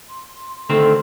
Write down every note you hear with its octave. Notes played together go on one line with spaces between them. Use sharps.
C6
D2 D#3 C4 A4